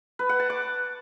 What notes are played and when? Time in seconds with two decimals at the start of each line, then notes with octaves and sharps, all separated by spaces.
0.19 B4
0.29 F#5
0.40 A5
0.50 D6